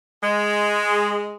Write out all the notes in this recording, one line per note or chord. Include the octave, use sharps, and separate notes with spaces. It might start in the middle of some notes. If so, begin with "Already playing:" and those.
G#3